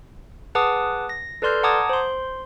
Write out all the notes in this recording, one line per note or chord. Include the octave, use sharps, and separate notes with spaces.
G#4 B4 F#5 A5 D6 D#6
A#6
A4 B4 D5 C6 F6 G6
F#5 A5 A#5 D6 D#6 G#6
C5 C6